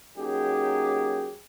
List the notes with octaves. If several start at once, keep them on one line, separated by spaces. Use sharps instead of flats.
F#3 A#3 C#4 D#4 G4 G#4